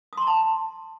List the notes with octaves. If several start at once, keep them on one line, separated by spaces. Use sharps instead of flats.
A5 A#5 C6 D#6